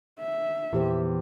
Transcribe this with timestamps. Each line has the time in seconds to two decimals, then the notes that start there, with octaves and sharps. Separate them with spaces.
0.20 E5
0.73 E2 A#2 G4 C5